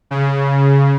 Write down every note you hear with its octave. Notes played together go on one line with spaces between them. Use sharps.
C#3